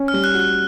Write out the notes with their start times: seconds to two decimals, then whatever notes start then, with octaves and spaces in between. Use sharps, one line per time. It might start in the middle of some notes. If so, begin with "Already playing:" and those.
Already playing: C#4
0.08 F6
0.14 G3
0.24 F#6
0.35 F#4 F#6